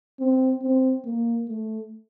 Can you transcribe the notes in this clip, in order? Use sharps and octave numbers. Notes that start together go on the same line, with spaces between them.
C4
C4
A#3
A3